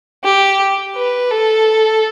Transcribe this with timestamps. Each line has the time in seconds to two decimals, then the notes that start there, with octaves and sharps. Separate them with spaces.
0.24 G4
0.97 B4
1.31 A4